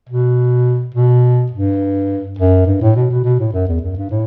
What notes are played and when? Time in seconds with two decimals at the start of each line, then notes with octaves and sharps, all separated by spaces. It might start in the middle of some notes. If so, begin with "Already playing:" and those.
0.09 B2
0.95 B2
1.52 G2
2.39 F#2
2.66 G2
2.81 A2
2.96 B2
3.10 B2
3.24 B2
3.39 A2
3.53 F#2
3.68 E2
3.81 F#2
3.96 G2
4.10 A2